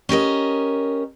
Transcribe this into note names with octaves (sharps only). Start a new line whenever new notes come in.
C#4 G4 A#4 D#5